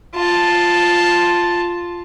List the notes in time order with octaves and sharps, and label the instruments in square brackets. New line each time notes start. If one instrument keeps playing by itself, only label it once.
[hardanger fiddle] F4 A5